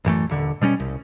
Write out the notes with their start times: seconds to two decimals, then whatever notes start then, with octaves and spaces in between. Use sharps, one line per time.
0.05 A1 F#2 E3 A3
0.30 D#1 D3
0.61 B2 G3 B3 C#4
0.80 C2